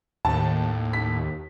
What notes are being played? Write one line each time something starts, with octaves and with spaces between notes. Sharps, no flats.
D#2 A2 A5
B6